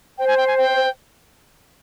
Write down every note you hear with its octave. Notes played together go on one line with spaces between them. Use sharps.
C5 G5
G#5
G5
G#5
G5